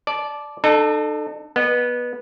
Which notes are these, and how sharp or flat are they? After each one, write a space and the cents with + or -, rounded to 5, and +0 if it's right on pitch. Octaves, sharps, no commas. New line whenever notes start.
D5 +0 A5 -20
D#4 -45 A4 +0
B3 -15 D#5 -35